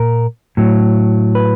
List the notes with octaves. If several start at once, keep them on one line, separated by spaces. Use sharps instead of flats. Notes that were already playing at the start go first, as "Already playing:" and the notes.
Already playing: A#2 A#4
A2 F#3
B4